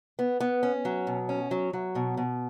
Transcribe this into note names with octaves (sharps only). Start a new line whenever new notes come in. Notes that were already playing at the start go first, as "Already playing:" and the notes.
B3
B3
C#4
F#3
B2
C#4
F#3
F#3
B2
B2